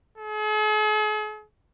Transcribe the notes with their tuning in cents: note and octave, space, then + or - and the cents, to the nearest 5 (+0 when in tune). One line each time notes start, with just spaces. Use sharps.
G#4 +45